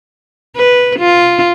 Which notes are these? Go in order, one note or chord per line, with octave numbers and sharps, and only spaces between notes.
B4
F4